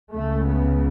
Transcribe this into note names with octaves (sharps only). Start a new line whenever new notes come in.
C#2 C#3 A3
B3